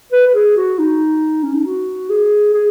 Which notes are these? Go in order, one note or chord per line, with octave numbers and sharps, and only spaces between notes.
B4
B4
G#4
F#4
D#4
C#4
D#4
F#4
G#4
G#4